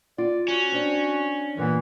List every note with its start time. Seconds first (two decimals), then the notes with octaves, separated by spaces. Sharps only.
0.18 F4 D5
0.48 C#4 F#4
0.72 C4 D4
1.57 G2 A#2 E3 B3